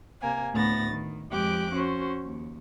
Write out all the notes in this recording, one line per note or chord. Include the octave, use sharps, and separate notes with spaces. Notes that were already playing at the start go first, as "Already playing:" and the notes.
C3 A#3 G#5
D2 A2 A3 B3 A6 A#6
D#3
F2 G#3 G4 G5 D6 F#6
C#4 F#4 C5
D#2